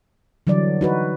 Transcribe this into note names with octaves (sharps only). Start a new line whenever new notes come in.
D3 E3 F#3 G3 D5
D#4 F#4 B4